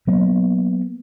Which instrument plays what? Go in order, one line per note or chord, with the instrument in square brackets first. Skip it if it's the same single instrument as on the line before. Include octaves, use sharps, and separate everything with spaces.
[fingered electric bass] F#3 A#3 B3